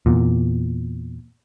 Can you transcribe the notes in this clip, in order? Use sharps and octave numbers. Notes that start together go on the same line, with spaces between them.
E2 A#2